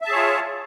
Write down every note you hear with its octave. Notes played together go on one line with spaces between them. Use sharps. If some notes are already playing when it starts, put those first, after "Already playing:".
F4 G#4 C#5 E5 A5